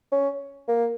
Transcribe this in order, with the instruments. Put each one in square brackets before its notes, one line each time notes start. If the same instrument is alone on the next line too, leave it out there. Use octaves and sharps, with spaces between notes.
[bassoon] C#4
A#3